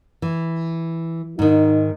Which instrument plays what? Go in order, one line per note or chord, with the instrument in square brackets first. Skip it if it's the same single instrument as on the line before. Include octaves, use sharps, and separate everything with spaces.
[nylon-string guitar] E3
[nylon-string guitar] G#2 D#3 [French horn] D#4